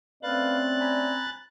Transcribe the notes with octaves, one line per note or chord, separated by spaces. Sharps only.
A3 C4 C#4 B4 D5 F5 F#6 A6
G#5 A#5 B5